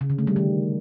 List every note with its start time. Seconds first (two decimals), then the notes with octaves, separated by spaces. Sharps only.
0.01 C#3
0.10 D3
0.19 A3
0.27 G3
0.36 D#3